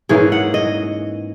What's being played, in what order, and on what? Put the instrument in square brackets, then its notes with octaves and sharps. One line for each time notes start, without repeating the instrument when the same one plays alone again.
[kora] G#2 E3 A#3 C#4 G#4
F#5
D#5